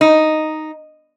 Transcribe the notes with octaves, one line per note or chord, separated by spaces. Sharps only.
D#4